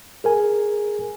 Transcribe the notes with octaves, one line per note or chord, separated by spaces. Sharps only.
G#4 A#4 G#5